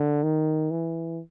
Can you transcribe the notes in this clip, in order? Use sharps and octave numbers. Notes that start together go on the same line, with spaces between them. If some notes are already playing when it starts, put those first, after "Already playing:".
Already playing: D3
D#3
E3